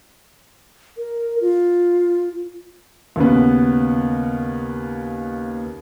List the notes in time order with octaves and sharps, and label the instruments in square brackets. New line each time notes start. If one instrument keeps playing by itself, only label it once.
[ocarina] A#4
F4
[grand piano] D#2 C#3 B3